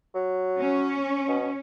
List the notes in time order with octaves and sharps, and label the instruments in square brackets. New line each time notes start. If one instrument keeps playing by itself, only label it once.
[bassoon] F#3
[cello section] C#4
[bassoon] B2